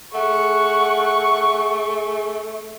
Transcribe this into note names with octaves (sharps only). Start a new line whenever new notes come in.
A3 G#4 F#5 C#6